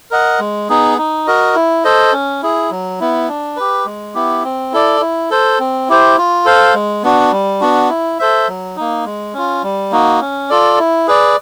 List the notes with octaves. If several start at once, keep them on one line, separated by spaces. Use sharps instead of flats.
A#4 D#5 F#5
G#3
B3 D#4 G#4
D#4
F#4 A#4 D#5
E4
A4 C5 D#5
C#4
E4 G#4
F#3
B3 E4
D4
G4 B4
G#3
B3 E4 G4
C4
E4 A4 D5
E4
A4 C5
C4
E4 G4 C5
F4
A4 C5 F5
G#3
B3 D4 F#4
G3
B3 D4 F#4
E4
A4 C5 E5
F#3
A#3 D#4
G#3
C#4 F4
G3
A#3 D#4 F#4
C#4
F4 A4 D5
E4
G#4 B4 D5